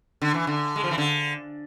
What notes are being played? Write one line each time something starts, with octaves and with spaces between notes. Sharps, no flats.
D3
E3
D3
G#3
F3
E3
D3